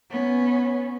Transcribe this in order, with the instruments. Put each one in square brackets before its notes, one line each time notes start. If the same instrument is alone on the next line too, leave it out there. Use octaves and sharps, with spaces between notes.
[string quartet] B3 C#4